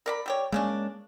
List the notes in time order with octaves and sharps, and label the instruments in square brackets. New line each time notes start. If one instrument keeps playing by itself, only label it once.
[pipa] A#4 D5 B5
G3 G4 C#5
[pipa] C#3 C#4 D4 [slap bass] G#3 A#3